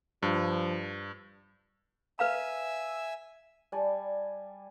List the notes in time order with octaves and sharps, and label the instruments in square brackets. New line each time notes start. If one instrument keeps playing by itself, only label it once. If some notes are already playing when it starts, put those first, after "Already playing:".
[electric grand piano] G2 [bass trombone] F3
[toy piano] B4 F5 A#5 [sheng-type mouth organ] E5 G#5 E6
[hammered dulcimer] G3 D5 G#5 A5